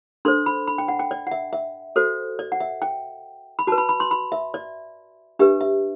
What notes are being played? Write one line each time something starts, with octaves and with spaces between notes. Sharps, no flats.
D4 A4 C5 C6
B5
B5
G5
F#5
G5
D5
F#5
E5
E5
F#4 A4 C5
D5
F#5
E5
G5
B5
F#4 B4 A5
B5
B5
C6
B5
E5
D5
D4 G4 B4 E5
E5